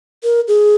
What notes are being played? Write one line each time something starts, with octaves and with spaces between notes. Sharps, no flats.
A#4
G#4